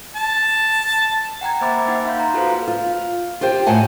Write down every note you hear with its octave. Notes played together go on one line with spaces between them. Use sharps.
A5
F#5 G5 A#5 G#6
A#3 C5 E5 B5 D6 A6
A#3 D#4 F#5
F5 C6 G6
A#5
F4 F#4 A4 B4 C5 F5
F4
F4 G4 C5 G5
A2 D#5 F#5 G#5 A5